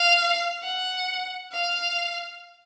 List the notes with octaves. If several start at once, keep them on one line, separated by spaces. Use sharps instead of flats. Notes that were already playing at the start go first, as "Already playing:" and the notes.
Already playing: F5
F#5
F5